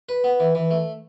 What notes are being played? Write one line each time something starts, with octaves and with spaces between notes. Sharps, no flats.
B4
B3
E3
E3
A3